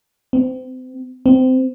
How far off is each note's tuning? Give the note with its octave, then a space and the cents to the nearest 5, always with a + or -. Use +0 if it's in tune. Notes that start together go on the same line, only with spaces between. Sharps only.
C4 -35
C4 -20